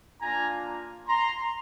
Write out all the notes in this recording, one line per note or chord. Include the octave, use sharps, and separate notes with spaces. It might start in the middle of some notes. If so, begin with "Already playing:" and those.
A#3 D4 F4 G#5 A#5
A#5 C6